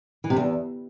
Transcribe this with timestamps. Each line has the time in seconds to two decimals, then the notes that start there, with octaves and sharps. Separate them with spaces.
0.24 E3
0.30 C3
0.36 E2